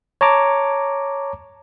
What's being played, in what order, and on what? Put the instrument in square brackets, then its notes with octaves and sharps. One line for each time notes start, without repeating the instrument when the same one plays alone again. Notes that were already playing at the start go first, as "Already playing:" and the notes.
[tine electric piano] C#5 A5 A#5 D6